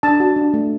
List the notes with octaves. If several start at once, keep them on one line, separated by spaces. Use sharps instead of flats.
D4 A5
F#4
D4
A3